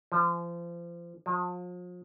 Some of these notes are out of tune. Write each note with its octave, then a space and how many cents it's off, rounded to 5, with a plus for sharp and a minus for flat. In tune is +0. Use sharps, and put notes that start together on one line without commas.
F3 -30
F3 +40